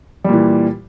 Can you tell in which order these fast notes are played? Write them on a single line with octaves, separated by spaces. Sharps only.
G3 A#2 E3